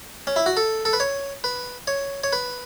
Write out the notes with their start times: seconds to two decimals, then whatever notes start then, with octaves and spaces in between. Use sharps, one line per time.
0.27 C#4
0.36 E4
0.46 F#4
0.57 A4
0.85 A4
0.93 B4
1.00 C#5
1.44 B4
1.87 C#5
2.24 C#5
2.33 B4